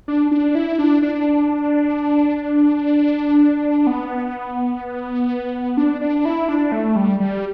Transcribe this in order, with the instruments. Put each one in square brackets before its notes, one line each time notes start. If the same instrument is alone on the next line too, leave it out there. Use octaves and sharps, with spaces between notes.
[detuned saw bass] D4
D4
E4
D4
D4
B3
D4
D4
E4
D4
A3
G3
G3